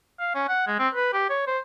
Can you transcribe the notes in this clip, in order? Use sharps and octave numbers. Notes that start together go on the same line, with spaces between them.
F5
C#4
F#5
G#3
C4
B4
G4
C#5
C5